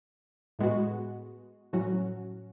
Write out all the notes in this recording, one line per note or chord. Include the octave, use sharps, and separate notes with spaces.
A2 G#3 B3 F#4
A2 F#3 C#4 F#4